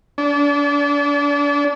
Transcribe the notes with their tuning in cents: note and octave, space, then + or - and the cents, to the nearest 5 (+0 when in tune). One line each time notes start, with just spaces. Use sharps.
D4 -35